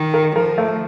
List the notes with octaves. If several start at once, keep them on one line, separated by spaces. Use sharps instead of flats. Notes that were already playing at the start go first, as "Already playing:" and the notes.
Already playing: D#3
A#4
F3 A#4
A3